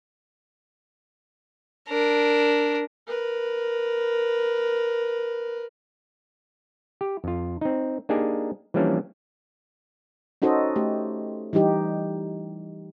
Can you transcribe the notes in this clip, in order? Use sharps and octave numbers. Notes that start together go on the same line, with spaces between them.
D4 A#4
A#4 B4
G4
F2 F4
C4 D#4
A#3 D4 D#4 G4 G#4 G#5
E3 F3 G3 A#3 C#4 D4
C#4 D#4 F#4 A4 C5 D#5
A3 G4
E3 G3 D#4 G4